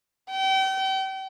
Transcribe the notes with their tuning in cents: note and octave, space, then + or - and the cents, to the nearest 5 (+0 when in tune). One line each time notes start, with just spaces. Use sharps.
G5 -35